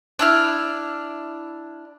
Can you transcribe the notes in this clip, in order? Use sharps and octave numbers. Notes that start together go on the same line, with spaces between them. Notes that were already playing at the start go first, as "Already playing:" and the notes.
D4 E4 F6